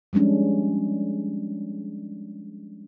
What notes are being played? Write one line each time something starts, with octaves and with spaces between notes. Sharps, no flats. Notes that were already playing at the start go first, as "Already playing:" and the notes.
F3 G3 G#3 C#4 D4